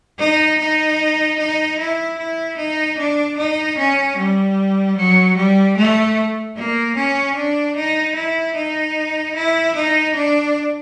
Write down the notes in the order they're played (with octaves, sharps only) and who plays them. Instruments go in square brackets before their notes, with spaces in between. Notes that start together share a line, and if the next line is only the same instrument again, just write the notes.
[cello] D#4
D#4
D#4
E4
E4
D#4
D4
D#4
C#4
G3
F#3
G3
A3
A#3
C#4
D4
D#4
E4
D#4
E4
D#4
D4